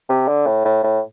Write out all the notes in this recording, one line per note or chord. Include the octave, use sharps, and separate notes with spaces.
C3
D3
A2
A2
A2